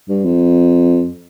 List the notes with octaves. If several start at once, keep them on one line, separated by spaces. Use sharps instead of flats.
G2
F2